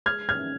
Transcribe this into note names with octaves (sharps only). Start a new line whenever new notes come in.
G#3 F6 G#6
F6 G#6